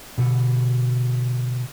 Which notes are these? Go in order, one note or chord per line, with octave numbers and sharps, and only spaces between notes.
B2 D3